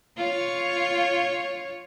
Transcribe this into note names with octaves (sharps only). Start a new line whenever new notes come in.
F4 C#5